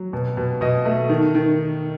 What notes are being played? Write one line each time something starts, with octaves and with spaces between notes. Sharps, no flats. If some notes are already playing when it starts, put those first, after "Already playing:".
Already playing: F#3
B2
B2
B2 D#5
A3
D#3
D#3